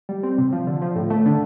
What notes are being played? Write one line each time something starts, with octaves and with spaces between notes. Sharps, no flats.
G3
C4
C3
F3
D3
F3
A2
A3
D3